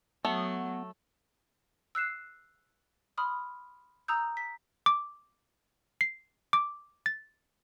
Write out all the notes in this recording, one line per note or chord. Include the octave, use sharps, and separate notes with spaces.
F#3 A3 B3
E6 F#6 C7 E7
B5 C6 D#6 F6
A#5 D#6 E6 G6
B6
D6
C7
D6
A6